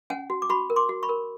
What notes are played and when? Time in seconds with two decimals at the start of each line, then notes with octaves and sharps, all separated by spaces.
0.10 C#4 F#5 G#5
0.30 F#4
0.42 D6
0.49 F#4 B5 C#6
0.70 A#4
0.76 C6 D6
0.89 F#4
1.03 B5 C#6
1.09 A#4